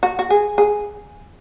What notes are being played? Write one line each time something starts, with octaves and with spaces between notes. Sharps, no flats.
F#4
F#4
G#4
G#4